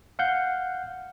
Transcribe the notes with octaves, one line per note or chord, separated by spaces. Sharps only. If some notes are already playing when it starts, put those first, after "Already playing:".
F5 F#5 G6